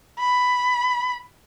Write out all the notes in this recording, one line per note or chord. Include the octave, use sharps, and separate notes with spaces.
B5